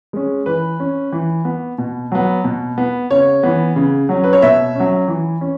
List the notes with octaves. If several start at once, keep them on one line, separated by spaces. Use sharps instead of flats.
G#3 C#4
E3 B4
C#4
E3
B3
B2
F#3 B3
B2
B3
C#3 C#5
E3 B3
C#3
F#3 C#4
B4
C#5
B2 E5
F#3 C#4
E3
C#4